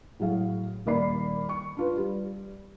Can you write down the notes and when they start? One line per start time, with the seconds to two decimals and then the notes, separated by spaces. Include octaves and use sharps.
0.20 A2 F#3 G#4 F5
0.86 D#1 D#3 A#3 D5 B5 C7
1.49 C#6
1.77 D4 F4 B4
1.97 G3